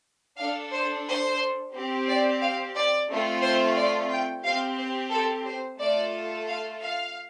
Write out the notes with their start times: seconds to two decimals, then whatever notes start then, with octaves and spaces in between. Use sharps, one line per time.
0.38 D4 A4 F5
0.72 C5
1.06 C5
1.73 C4 G4
2.07 D5
2.41 F5
2.75 D5
3.09 A3 C4 F4
3.42 C5
3.76 D5
4.10 G5
4.44 C4 G4 F5
4.77 C5
5.12 A4
5.45 C5
5.79 A3 F4 A4 D5
6.47 F5
6.81 F5